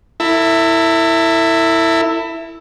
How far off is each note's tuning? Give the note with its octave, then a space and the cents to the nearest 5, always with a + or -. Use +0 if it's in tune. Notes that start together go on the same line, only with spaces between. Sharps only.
E4 +0 A4 +40